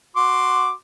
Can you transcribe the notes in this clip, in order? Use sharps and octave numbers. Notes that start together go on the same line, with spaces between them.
F#4 C6 D6